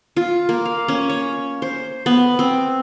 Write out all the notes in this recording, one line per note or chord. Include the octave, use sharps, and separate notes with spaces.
F4
A#3
F5
C#4
C#5
C5
B3
C4